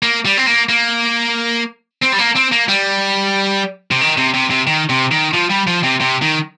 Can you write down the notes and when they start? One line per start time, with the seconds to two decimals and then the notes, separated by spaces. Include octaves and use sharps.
0.03 A#3
0.25 G3
0.38 C4
0.47 A#3
0.69 A#3
2.02 C4
2.12 G3
2.18 A#3
2.35 C4
2.52 A#3
2.68 G3
3.91 C3
4.01 D#3
4.18 C3
4.34 C3
4.50 C3
4.67 D#3
4.90 C3
5.12 D#3
5.34 F3
5.50 G3
5.67 F3
5.83 C3
6.00 C3
6.22 D#3